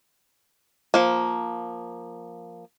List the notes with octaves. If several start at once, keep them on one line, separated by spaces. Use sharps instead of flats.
F3 A#3